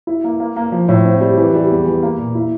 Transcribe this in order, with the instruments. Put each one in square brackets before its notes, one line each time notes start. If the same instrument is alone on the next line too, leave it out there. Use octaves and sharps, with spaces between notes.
[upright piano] E4
A#3
A#3
A#3
F3
A2
C4
G3
E3
G3
E2
E3
A#3
A#2
E4